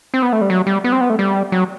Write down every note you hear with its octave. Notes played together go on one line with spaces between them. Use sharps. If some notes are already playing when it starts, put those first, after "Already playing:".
C4
B3
A3
G3
F#3
G3
B3
C4
B3
A3
G3
F#3